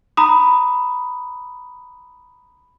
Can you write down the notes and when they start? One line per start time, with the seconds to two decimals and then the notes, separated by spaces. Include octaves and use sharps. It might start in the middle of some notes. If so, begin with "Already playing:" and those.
0.17 A#5 B5 D#6